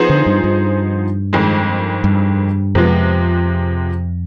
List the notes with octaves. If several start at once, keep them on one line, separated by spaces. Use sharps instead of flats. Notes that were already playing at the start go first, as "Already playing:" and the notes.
Already playing: F3 B3 D#4 G#4 C5
D3
G2
G2
F2 D#3 G#3
G2
F2 C3 F3 G#3 B3